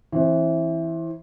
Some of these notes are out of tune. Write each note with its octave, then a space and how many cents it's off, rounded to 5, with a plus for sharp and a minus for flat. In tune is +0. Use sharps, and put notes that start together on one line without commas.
E3 +0 C4 +25